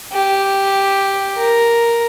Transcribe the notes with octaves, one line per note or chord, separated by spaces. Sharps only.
G4
A#4